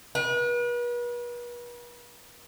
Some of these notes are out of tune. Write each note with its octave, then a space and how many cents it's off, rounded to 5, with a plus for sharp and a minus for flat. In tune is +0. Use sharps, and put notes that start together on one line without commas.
B4 -40